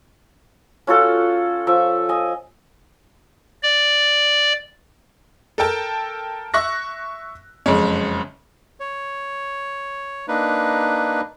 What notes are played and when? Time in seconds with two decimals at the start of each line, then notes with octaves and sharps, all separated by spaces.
0.87 C#4 F4 F#4 A4
1.67 F3 E5
2.09 D#5 G#5
3.63 D5
5.58 A4 A#4 G5 A5
6.54 E5 C#6 F#6 A#6
7.66 F#1 F2 G#3 C#4
8.80 C#5
10.28 A#3 D4 D#4 B4